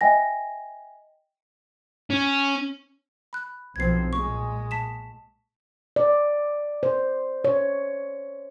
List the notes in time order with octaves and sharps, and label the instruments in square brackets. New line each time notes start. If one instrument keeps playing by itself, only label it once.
[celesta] D#5 E5 G5 G#5 A#6
[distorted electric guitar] C#4
[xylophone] B5 F#6
[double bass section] B1 F3 C4 [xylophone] G#6 C7
[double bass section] A#2 G#3 [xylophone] C#6
[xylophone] A5 B6 E7
[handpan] D5
C5
C#5